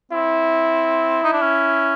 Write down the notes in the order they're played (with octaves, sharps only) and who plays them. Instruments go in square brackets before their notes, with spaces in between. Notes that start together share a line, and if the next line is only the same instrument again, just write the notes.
[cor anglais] C4 [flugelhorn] E4
[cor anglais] D#4
D4
C#4